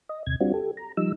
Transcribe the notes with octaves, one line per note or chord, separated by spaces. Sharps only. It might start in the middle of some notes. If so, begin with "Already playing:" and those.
D#5
D#2 C3 G#6
G3 C4 D4 F4 F#4
G4 A4
A#5
F3 G3 D#4 E6